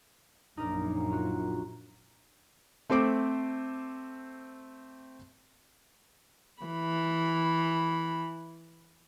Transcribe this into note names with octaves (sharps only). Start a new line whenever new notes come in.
A#1 F#2 D4 D#4 A#4 D5 A#5
F4 F#4
A3 C4 C5 D6 D7
E3 B5